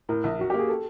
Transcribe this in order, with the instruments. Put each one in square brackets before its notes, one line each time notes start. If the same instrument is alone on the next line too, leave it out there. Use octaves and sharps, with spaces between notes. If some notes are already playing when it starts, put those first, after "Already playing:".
[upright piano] A2 [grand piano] A#4
[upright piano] A#1
[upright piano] F#3 [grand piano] F#4
[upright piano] A#3 [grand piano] G4
[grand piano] G#4
A4